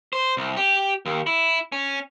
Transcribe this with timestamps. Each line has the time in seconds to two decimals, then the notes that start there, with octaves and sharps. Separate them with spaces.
0.13 C5
0.37 C2
0.57 G4
1.06 D#2
1.27 E4
1.72 C#4